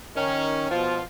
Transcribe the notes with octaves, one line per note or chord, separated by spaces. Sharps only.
D#3 C#4
B2 F3 F4